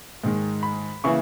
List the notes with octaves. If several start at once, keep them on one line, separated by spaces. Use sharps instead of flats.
G#2 D#3 G#3
B5
C#3 E3 A#3 E4 C#6